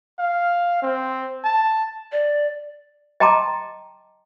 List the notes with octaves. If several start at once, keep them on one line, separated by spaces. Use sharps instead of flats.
F5
C4
A5
D5
D#5 G5 A5 A#5 C6 D6